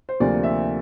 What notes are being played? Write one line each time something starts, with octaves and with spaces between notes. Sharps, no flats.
C5
D2 C3 F3 A#3 D4 D5
E5